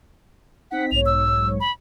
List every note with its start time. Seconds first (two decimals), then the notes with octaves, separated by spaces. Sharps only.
0.71 C4 D#4 F#5 B6
0.91 B1 G#2 C#5 F7
1.06 E6
1.60 B5